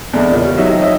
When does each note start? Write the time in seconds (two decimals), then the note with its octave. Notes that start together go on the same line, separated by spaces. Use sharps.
0.13 E2 D3 G#3 D4 D5
0.31 A#2 C#3
0.45 C#4 G4
0.57 F#3 D#4 E5
0.69 D#3 F3 C#5
0.82 D#5 E5